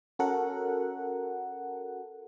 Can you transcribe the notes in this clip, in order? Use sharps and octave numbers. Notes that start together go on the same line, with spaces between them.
C#4 F#4 A4 A#4 F#5